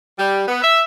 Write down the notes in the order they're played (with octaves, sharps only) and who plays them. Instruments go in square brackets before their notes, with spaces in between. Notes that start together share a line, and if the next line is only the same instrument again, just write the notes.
[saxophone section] G3
B3
E5